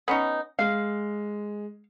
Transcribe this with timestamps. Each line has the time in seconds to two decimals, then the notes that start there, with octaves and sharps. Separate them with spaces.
0.08 B3 C#4 D#4
0.59 G#3 F5